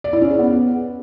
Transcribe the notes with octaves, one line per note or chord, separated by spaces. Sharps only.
D5
E4
C#4
G#4
B3